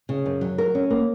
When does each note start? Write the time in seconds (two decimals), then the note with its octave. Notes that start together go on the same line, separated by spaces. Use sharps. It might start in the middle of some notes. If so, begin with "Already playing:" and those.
0.09 C#3
0.26 F#2
0.41 F#3
0.58 A#4
0.75 C#4
0.90 A#3